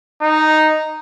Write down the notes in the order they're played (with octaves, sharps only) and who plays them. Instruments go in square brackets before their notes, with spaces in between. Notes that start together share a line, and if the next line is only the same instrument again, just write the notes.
[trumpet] D#4